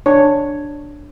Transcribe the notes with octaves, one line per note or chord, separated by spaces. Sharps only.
D4 C#5